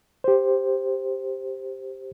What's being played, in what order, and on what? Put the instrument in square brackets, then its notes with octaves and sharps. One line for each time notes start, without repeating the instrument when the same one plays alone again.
[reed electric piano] G4 C5